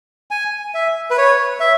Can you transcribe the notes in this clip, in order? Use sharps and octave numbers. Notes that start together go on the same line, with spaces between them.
G#5
E5
B4
C#5
E5